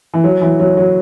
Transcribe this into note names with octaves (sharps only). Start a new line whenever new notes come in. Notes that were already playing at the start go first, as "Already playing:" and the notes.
E3
F#3
E3
F#3
F#3